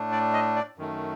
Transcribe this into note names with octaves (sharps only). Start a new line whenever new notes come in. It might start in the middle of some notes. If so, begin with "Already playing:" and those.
Already playing: A2 A3 D4
D5
D#5
D5
F#2 D#3 A3